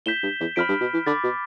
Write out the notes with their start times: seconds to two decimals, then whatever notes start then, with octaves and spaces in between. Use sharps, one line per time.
0.05 A2 G6 B6 E7 G7
0.23 G2
0.40 E2
0.56 F2 B5 F6 B6 D7
0.69 G2
0.81 B2
0.93 E3
1.06 D3 B5 D6 A6
1.23 B2